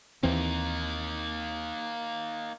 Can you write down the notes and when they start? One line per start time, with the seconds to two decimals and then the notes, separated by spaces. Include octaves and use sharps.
0.23 D#2 E3 A#3 C4 D#4